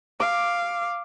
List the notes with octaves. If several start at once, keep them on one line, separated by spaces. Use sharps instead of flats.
F5 D6